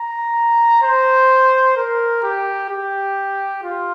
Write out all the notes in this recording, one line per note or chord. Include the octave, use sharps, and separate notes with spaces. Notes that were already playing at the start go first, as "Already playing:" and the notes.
Already playing: A#5
C5
A#4
G4
G4
F4